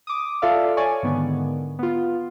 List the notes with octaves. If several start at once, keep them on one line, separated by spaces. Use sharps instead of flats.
D6 D#6
F4 A4 D5 E5 F5
C#5 D5 G#5 C#6
G#2 D3 D#3 B3
B3 F4